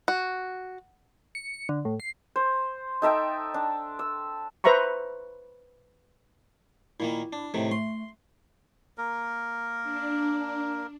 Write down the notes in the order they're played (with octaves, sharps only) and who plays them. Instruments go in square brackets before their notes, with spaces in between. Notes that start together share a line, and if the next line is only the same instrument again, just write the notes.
[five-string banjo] F#4
[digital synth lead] C#7
C#7
D3
A2
C7
[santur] C5
D#4 A4 E5 G5
D4
E6
[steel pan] B4 C5 E5 A#5 B5 C#6
[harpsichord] A#2 D#3 A#3 [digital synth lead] E4
[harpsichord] D4
A2 C3 D#3
[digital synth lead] A3 [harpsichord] C6
[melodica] A#3 A#4
[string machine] D4